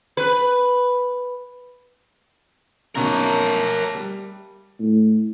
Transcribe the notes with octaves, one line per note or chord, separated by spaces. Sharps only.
B4
F#2 B2 D#3 A3 A#3 A#4 C#5
G3
A2